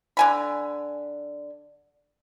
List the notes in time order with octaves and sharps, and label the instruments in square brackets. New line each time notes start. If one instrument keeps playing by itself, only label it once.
[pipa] D3 G#5 B5